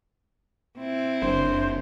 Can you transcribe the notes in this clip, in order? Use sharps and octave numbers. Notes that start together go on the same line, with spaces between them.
C4 E4
F#1 D4 C5